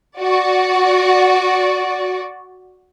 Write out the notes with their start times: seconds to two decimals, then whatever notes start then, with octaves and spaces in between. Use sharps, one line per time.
0.19 F#4 D5